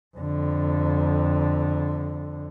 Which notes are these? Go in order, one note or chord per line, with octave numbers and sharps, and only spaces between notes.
F2 D3